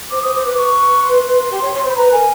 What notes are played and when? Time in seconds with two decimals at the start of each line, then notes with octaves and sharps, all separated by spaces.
0.11 C5 D6
0.22 C5 D#6
0.34 C5 D6
0.45 B4 D6
0.57 B4 C#6
1.03 C6
1.51 G4
1.62 C#5
1.74 C#5
1.84 C5 B5
1.96 B4 A#5
2.12 A#4 G#5